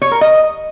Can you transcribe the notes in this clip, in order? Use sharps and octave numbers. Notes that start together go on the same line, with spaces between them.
C#5
A#4
D#5